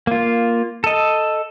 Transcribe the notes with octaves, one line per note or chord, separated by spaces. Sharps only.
A#3 F4
A4 D#5